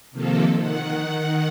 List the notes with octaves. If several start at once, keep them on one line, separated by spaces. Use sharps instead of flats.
C3 D#3 F3 A#3 A4
D#3 F#5